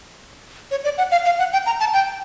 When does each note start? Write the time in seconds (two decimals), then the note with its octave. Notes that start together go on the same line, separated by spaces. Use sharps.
0.71 C#5
0.84 D5
0.98 F#5
1.12 F5
1.25 F5
1.39 F#5
1.53 G5
1.66 A#5
1.80 A5
1.93 G5